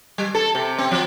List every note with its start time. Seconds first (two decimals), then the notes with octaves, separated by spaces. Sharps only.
0.18 G3
0.35 A4
0.55 C3
0.78 C4
0.91 F3